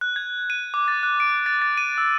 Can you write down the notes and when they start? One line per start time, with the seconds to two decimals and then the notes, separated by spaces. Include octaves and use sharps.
0.01 F#6
0.16 G#6
0.50 D#7
0.74 D6
0.88 A6
1.03 F#6
1.20 D7
1.46 A6
1.62 A6
1.77 D#7
1.98 E6